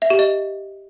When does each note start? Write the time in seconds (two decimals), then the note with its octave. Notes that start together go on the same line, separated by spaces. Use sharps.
0.02 E5
0.10 G4
0.19 D#5